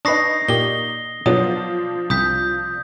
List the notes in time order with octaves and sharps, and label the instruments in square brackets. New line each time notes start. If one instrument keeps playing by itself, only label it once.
[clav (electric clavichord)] D4 B4 [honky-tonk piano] D#4 C#6 [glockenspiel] D#6 A#6 C7
[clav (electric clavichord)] A#2 G4 [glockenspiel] G7
[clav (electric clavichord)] B2 F#3 [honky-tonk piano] F3 D4 [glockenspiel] D#6
[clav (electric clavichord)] C2 [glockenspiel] D#6 G6 B6